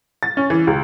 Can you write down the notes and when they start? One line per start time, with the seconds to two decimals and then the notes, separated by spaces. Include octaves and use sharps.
0.23 A6
0.37 C#4
0.50 E3
0.67 C#2